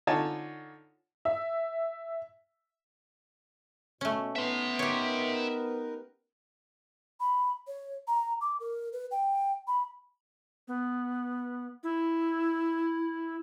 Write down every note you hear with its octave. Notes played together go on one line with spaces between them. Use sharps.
D3 D#4 F4 C#5 G#5 A5
E5
B2 A3 C#4
B3 D#4 E5 C6
D#4 G4 A#4 B4 C#5
B5
C#5
A#5
D6
A#4
B4
G5
B5
B3
E4